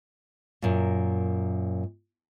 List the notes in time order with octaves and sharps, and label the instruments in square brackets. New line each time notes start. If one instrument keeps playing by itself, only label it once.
[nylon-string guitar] F#2 A#2